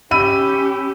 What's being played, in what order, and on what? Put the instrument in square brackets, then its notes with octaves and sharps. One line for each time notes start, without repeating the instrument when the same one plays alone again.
[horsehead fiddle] C#4 G4 [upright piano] B5 E6 D#7